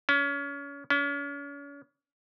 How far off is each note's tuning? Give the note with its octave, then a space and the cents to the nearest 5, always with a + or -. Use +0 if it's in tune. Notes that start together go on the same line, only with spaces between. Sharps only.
C#4 +30
C#4 +40